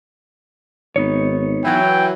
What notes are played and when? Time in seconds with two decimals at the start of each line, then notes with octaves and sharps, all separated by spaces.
0.96 G#1 B3 D#4 C#5
1.65 E3 F#3 G5